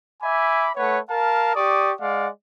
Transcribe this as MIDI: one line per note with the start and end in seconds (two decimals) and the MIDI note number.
0.23 0.70 76
0.23 0.70 80
0.23 0.70 83
0.23 0.70 86
0.76 0.99 57
0.76 0.99 71
0.76 0.99 73
0.76 0.99 78
1.10 1.53 70
1.10 1.53 77
1.10 1.53 81
1.55 1.91 67
1.55 1.91 74
1.55 1.91 85
1.55 1.91 87
2.00 2.28 56
2.00 2.28 74
2.00 2.28 77
2.00 2.28 78